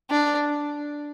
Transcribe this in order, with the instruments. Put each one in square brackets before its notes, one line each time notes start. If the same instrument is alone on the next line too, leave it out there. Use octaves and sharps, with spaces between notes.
[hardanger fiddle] D4